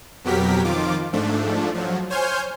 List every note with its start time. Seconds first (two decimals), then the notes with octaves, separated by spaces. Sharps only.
0.24 F2 B2 F#3 G4 A#4 B6
0.64 F2 D#3 F3 F4 D6
1.13 G#2 F3 A3 D4
1.74 F3 F#3
2.10 C5 C#5 G#5 C6 F6 G6